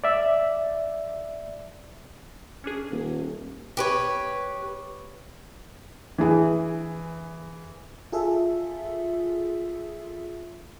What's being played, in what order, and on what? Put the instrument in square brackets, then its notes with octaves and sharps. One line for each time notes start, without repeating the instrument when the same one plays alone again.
[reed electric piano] D5 E5
[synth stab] C#4 D4 G#4
[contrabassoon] D#1
[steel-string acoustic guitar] G4 B4 C#5
[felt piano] E3 G#4
[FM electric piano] F4 G#4 A4 E5